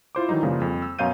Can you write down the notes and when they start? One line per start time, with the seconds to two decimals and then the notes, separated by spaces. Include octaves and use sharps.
0.15 E4 F4 C5 D6
0.29 D#3 E3 F#3 G3 D#4
0.43 F#2 C#3 F3 G3 G#3 A#3
0.61 F2
0.82 E6
0.99 F#2 B2 C#5 F5 G6 D#7